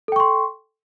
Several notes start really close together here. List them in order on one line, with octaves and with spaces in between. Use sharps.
A4 G5 C#6 C6